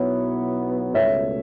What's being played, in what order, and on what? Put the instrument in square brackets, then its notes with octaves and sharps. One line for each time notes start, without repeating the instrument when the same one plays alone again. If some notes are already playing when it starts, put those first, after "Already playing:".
Already playing: [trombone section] B1 B2 F#3 B3 E4 [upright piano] C#5
[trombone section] C#2 B2 A3 [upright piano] C#5 E5